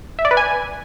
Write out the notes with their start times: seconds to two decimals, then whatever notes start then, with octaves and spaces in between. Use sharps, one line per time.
0.19 E5
0.25 D5
0.31 B4
0.37 G#5